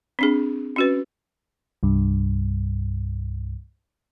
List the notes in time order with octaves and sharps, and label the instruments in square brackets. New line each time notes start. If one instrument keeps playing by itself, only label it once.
[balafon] C4 D4 G#4
C#4 F#4 B4
[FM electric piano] C2 G2